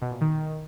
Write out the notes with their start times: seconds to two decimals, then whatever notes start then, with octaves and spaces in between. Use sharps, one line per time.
0.02 B2
0.11 A#2
0.21 D#3